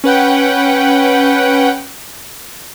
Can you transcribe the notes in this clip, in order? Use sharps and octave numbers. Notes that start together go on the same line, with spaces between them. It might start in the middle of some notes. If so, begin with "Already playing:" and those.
C#4 B4 F#5 G5